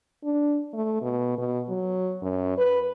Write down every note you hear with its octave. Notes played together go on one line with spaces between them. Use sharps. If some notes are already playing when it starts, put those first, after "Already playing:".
D4
A3
B2
B2
F#3
F#2
B4